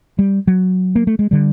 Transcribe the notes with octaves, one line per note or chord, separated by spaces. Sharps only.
G3
F#3
A#3
A3
G#3
D3 G3